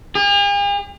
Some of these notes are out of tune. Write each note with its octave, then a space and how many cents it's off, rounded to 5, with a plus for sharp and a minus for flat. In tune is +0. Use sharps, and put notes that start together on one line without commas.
G#4 -45